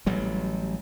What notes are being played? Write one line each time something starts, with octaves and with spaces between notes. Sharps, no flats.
A1 F#3 G3